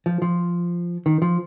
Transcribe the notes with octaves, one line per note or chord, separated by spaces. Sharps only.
F3
F3
D#3
F3